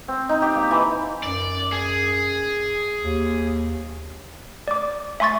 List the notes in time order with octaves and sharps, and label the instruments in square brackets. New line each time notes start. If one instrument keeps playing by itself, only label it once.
[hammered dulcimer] C4
D#4
G4
A#3
E3
[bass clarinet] F#2 [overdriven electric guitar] D5
[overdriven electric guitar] G#4
[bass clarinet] D#2
[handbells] D5 D6
E5 G#5 C6 C#6 A6